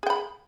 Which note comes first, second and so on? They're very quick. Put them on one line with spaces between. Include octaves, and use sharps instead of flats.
G#4 G5 B5